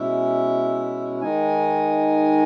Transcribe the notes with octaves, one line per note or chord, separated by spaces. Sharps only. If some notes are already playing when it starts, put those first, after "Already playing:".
Already playing: B2 G#3 C#4 E4 E5
D#3 G#3 D#4 G#5